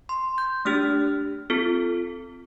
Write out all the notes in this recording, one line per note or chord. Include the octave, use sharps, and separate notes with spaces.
C6
G6
A3 D4 G4 F6
C4 F4 A4